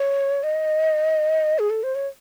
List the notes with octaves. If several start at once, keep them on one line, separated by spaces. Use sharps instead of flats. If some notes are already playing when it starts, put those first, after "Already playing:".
Already playing: C#5
D#5
G#4
A4
C5
C#5